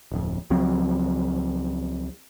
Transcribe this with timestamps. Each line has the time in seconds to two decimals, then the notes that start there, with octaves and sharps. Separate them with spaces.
0.12 D1 F2
0.50 C#2 F3 F#3 C4